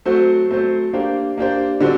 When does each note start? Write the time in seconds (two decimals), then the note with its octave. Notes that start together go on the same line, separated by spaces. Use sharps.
0.06 F#3 A3 C4 F#4 C5
0.50 F#3 A3 C4 F#4 C5
0.93 A#3 D4 G4 C5
1.38 A#3 D4 G4 C5
1.81 D3 G3 C4 F#4